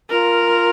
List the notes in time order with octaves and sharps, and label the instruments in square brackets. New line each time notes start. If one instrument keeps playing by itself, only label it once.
[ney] F4 [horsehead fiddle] A#4